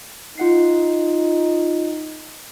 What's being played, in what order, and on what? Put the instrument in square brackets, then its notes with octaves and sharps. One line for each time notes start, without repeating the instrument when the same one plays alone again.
[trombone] D#4 [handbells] F4 F#5 C7